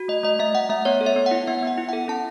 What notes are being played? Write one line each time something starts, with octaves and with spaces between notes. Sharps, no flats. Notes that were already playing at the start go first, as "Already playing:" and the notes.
Already playing: F#4
A3 D#5
A3 D#5
A3 E5
A3 F#5
A3 E5
B3 C#5
A4
E5
B3
F#5
E4
B3 E5
B3 F#5
E4
F#5
A4
C#4 A5